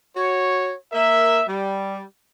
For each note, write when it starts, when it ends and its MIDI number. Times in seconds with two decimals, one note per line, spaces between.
0.17 0.75 66
0.17 0.75 73
0.93 1.44 58
0.93 1.44 70
0.93 1.44 76
1.48 2.04 55